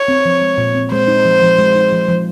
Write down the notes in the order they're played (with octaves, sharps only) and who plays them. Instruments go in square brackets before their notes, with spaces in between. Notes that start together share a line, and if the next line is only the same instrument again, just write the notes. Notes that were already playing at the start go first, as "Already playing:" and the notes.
Already playing: [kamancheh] C#5
[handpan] C4
F3
G#3
A#2
C4
[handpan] G#3 [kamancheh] C5
[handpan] D#4
F3
F3
G#3
D#4
F3
F3